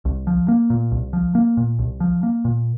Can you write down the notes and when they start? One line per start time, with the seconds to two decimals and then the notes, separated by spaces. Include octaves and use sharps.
0.05 C2
0.27 F3
0.48 A#3
0.70 A#2
0.91 C2
1.13 F3
1.35 A#3
1.57 A#2
1.79 C2
2.00 F3
2.23 A#3
2.45 A#2